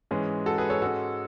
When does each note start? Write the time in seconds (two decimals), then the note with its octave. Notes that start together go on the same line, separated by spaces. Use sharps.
0.11 G#2 E3 G#3 C#4 G#4
0.46 F#4 A4
0.58 G#4 B4
0.70 A4 C#5
0.82 G#2 G#3 C#4 F#4 A4